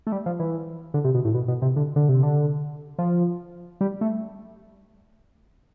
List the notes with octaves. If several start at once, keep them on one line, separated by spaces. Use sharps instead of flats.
A3
G3
F3
E3
D3
C3
B2
A2
B2
B2
C3
D3
D3
C3
D3
F3
G3
A3